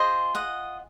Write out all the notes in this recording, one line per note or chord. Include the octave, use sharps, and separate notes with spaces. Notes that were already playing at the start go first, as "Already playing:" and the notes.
Already playing: F4 G#4 C5 D#5
D#5 F#5